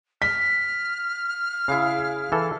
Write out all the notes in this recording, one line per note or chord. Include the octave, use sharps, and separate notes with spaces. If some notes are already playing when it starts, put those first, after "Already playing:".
F6 B6
C#3 E4 G#4 F5
E3 A4